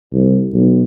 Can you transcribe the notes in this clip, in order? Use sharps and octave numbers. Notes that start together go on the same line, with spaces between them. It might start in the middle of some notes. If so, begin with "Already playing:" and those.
C2
B1